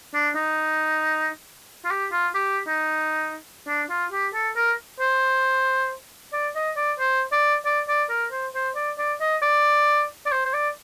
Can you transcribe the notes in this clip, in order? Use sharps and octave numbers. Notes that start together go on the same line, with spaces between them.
D4
D#4
F4
G4
F4
G4
D#4
D4
F4
G4
A4
A#4
C5
D5
D#5
D5
C5
D5
D5
D5
A#4
C5
C5
D5
D5
D#5
D5
D5
C5
C5
D5